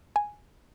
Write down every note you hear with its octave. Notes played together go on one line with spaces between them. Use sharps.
G#5